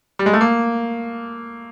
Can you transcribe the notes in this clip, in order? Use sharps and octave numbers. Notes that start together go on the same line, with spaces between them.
G3
G#3
A3
A#3